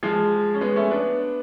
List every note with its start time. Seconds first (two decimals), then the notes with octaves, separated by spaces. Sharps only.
0.03 F3 G#3
0.54 C#4
0.61 G#3 B3
0.76 A3 C#4
0.91 B3 D4